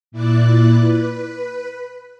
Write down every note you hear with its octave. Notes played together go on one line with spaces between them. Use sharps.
A#2 E4 D5 D6 F#6
B4